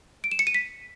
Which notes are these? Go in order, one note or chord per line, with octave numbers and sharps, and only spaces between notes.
D7
E7
C#7
D#7
B6